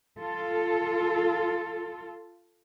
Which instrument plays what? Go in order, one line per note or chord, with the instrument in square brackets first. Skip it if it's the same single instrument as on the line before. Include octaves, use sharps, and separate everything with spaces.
[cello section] F4 A4